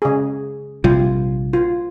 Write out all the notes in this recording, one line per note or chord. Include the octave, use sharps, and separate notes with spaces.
C#3 G#4
A#1 C3 G3 F4
F4